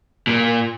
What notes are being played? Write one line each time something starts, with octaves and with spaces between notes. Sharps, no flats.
A#2